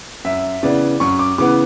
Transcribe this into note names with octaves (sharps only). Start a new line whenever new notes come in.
F#2 E5
C#3 E3 B3 D5
F#2 C#6
D6
C#3 E3 B3 D6